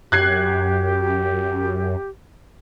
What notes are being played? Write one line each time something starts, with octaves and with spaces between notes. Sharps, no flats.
F#2 G4 F#6 G#6 C7